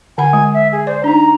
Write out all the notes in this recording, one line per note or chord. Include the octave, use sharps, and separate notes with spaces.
D3 F#5 G#5 B5
G#3
E5
G#4
C5 D5
D4 D#4 A#5